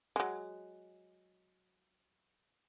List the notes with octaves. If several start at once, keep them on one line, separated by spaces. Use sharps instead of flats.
F#3 G#3